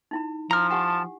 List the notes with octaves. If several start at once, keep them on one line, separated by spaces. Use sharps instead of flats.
D#4 E4 B5
F3 E4 A#5 F6
G4 F#5 G#5 A5